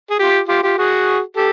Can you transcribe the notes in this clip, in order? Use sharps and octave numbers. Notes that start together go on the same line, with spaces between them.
G#4
F4 G4
F4 G4
F4 G4
F#4 G#4
G4 A4